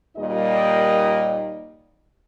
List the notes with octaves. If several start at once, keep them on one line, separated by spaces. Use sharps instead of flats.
D#2 A#2 G3 D#4 D#5